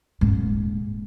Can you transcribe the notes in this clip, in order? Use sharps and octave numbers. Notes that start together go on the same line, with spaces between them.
D#1 G#2